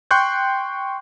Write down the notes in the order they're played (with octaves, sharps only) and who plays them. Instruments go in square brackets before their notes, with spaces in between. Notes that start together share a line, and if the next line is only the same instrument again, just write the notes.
[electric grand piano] G5 C6 C#6 F#6 G6